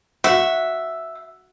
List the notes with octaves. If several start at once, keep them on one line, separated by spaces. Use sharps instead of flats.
F#4 E5 F#5